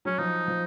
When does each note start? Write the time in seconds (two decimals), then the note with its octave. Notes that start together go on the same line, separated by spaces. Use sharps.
0.05 F#3 C#4
0.18 F3 D#4
0.48 F3